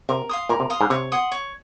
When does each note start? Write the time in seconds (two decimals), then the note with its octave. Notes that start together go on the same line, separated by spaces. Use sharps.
0.09 C3 A#4
0.29 F5 C6 D#6
0.49 A#2 A#4
0.60 C3
0.70 F5 C6 D#6
0.81 G#2
0.90 C3 C#5
1.12 F#5 C6 D#6
1.32 C#5